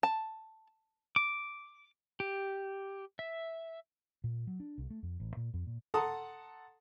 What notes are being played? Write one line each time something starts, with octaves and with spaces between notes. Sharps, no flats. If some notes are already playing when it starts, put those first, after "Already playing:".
A5
D6
G4
E5
A#2
F#3
D4
C2
A3
F2
A1
A#2
F2
A#2
A4 F#5 A5 A#5 C6 D#6